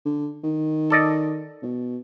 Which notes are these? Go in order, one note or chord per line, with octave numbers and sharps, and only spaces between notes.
D3
D#3
A4 D5 D#5
B2